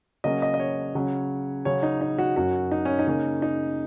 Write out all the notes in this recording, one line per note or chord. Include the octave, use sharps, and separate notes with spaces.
C#3 F#3 A#3 C#4 D#5
D#5
D#5
C#5
C#3 F#3 C#4
C#3 F#3 C#4 C#5
D#4
D#4
F#4
F#2 F#3 C#4 F#4
D#4
C#4
D#4
C#3 A#3 C#4
D#4